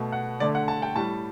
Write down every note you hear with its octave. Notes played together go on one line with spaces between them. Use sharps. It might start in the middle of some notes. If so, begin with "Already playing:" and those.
Already playing: B2 A3
F#5
D3 A3 D5
F#5
A5
G5
A2 G3 A5